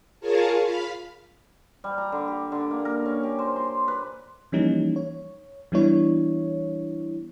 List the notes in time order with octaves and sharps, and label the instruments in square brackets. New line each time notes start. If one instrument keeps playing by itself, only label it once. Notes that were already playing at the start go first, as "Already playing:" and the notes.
[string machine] F4 G#4 A#4 C#5 A5
F5 B5
[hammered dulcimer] G3
A#5
D3
G4
D3
A#3
A#4
C#4
G4
C5
C6
B4
[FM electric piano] E3 F3 G3 A#3 C#4 D#4
C#5
E3 G3 B3 D4 E4 C#5